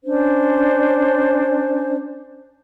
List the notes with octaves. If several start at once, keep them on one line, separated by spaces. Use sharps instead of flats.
C#4 D4 C5